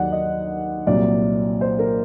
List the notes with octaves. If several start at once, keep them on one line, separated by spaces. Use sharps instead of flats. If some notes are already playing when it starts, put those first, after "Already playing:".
Already playing: D#2 D#3 F#3 D5 F#5
D#5
C2 A#2 F#3 D5
C5
A#4